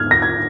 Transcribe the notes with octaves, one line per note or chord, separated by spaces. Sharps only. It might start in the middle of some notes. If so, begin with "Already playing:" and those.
Already playing: G#2 F6 G#6
A#6
G#6